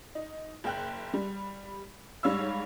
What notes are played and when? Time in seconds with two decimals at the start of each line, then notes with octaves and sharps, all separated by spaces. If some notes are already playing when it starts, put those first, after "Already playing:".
0.15 D#4
0.64 F#1 G5 F#6
1.13 G3
2.23 G#2 G3 C#5 F5 E6